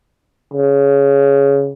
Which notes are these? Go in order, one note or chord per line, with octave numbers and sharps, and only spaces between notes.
C#3